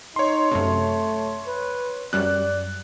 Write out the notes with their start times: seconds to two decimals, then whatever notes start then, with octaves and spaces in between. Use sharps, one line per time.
0.16 D#4 C#5 C6
0.51 F#2 C3 A3
1.47 B4
2.13 F#2 G3 D5 F#6